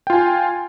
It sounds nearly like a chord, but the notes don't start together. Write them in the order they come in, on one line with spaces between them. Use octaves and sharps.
G5 F4 G#5